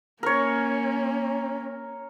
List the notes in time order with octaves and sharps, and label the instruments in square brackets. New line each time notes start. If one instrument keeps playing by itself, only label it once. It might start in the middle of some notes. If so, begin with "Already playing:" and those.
[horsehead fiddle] A#3 C#4 [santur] A#4 C#5